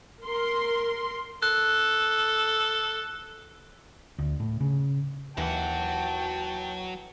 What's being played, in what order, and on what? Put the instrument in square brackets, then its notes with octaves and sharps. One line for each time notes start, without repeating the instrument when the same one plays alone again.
[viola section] A#4 C6
[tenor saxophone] A4 [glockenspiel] F#6
[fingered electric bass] D2
A2
C#3
[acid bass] D#2 [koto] E3 [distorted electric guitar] F#3 F#5 [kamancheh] G5 A5